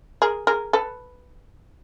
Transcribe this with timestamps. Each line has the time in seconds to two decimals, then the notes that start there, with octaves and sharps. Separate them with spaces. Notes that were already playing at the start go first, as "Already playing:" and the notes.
0.22 G#4 A#4
0.47 G#4 A#4
0.73 A4 B4